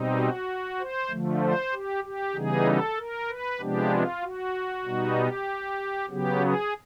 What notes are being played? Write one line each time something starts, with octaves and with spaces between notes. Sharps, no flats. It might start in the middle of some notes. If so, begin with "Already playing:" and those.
Already playing: B2 G3 C4 D#4
F#4
C5
D3 F3 A3
C5
G4
G4
C#3 E3 G3 B3 D#4 G#4
A4
A#4
B4
C3 F3 G#3 B3 D4 G4
F4
F#4
B2 G3 B3 D#4
G4
C#3 F#3 B3 G4
G#4